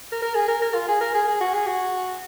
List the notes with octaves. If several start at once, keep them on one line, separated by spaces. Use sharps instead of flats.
A#4
A#4
G#4
A#4
A#4
F4
G#4
A#4
G#4
G#4
F#4
G#4
F#4